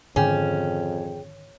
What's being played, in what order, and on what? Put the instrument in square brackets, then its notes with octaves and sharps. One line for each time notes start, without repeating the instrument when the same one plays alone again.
[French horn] F2 [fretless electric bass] G#2 D3 D#3 [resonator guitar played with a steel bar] C#4 [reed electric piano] G#4 G5